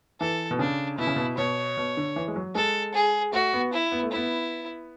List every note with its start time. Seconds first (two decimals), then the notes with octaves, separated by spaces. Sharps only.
0.20 E3 A4
0.51 B2
0.59 C#3 D4
0.98 B2 E4
1.07 C#3
1.16 B2
1.38 B2 C#5
1.77 B2
1.97 D3
2.16 E3
2.28 G#3
2.36 F#3
2.55 G#3 A4
2.94 G#4
3.33 A3 F#4
3.53 B3
3.73 E4
3.92 B3
4.03 A3
4.12 B3 E4